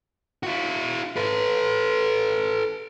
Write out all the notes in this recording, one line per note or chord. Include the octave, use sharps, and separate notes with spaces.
E4 F#4
A4 B4